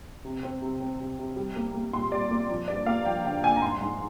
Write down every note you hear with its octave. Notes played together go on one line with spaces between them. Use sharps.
C3
C4
C3
C4
C3
C3
G3
A#3
A#3
A#2 C6
G3 D5
A#3
F3
G2 D5
A#3 F5
F3 G5
D3 G5
D3 G#5
A#5
G#2 C6
G#2